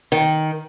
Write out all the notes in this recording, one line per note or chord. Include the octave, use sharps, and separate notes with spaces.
D#3